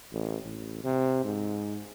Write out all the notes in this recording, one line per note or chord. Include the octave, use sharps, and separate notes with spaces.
A1
A1
C3
G#2